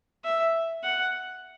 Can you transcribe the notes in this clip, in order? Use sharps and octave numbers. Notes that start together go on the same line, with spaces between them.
E5
F#5